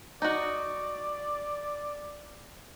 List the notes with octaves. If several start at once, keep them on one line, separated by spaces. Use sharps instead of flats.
D#4 F#4 D5